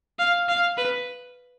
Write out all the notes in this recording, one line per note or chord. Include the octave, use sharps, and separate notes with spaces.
F5
F5
B4